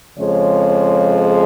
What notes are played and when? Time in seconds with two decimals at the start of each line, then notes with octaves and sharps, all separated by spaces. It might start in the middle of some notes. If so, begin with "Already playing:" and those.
0.17 F2 C#3 F3 G#3 C#5